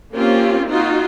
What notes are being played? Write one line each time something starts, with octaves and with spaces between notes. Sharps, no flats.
A#3 C4 C#4 F4 G4
D#4 F4 F#4